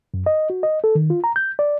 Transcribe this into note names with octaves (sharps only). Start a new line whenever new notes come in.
F#2
D#5
F#4
D#5
A4
D#3
F4
A#5
G6
D5